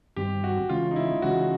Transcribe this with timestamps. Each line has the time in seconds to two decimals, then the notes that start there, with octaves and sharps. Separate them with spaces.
0.16 G2 D#3 G3 C4 G4
0.44 F#4
0.69 C#3 E3 G#3 C#4 F4
0.91 D#4
0.96 E4
1.22 C#3 E3 G#3 C#4 F#4